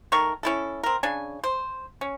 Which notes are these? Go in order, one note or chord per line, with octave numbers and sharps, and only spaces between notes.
D#3 A3 A#4 C#6
C#4 E4 A4
C4 A#4
C#3 D4 G#5
C5
C#4